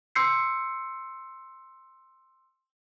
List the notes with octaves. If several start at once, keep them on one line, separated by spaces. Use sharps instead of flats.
C6 E6 G6 C7 C#7